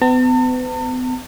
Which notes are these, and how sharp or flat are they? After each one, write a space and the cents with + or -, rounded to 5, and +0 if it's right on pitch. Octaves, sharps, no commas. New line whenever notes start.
B3 +40 A5 +45